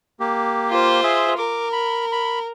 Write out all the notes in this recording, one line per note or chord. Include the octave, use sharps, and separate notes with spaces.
A#3 G4
F4 C5
G#4 E5
A#4 D6
B5
B5